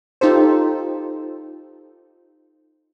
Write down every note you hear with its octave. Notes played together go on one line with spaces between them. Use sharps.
D#4 F4 G4 A4 C5